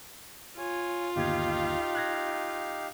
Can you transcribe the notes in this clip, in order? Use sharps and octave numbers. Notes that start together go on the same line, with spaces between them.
F4 C#5 G#5
G1 D#2 D#4 G4 F5 G#6
F#6 G#6 A#6